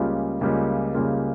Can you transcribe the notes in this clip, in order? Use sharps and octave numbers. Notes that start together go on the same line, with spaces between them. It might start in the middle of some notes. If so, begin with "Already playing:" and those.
Already playing: C#2 C#3 G3 A#3 F4
C#2 C#3 G3 A#3 F4
C#2 C#3 G3 A#3 F4